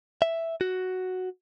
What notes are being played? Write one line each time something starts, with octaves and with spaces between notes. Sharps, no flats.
E5
F#4